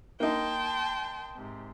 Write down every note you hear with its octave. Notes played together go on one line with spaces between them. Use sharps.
A#3 D#4 G5 A5 C6
G#2 C3